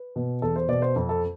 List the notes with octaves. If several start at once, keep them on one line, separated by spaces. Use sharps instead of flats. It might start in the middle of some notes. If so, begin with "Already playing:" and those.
Already playing: B4
B2
E2 A4
C5
B2 D5
C5
F2
A4